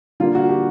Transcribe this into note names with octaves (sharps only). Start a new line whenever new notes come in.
D3 G3 A#3 F4
F#4
G4